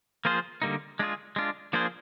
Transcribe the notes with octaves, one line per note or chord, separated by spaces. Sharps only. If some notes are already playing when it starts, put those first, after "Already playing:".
F3 A#3 F4 G#4 C5
D3 G3 A#3 D#4
G#3 D4 F4 G#4
G#3 D4 F4
F3 A#3 D4 G#4 C5